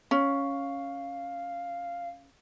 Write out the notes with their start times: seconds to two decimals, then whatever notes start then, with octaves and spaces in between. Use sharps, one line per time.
0.11 C#4 F5